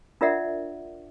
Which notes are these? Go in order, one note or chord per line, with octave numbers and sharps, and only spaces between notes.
D4 F4 A#4 D5 E5 F#5